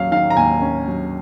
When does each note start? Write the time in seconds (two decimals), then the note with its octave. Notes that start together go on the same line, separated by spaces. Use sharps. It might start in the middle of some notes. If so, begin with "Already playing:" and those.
Already playing: D#2 F#3 C#4 F5
0.11 D#3 F5
0.30 A#5
0.37 D#2 G#5
0.62 C#4
0.88 F#3